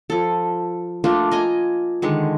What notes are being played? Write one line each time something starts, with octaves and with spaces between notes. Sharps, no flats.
F3 A4
A3 A#3 D4 F4
D#5 G#5 A#5
D3 D#3 G#3